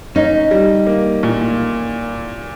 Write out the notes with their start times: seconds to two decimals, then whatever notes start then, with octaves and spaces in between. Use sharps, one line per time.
0.15 C#4 D#4
0.51 G3
0.87 A#3
1.23 A#2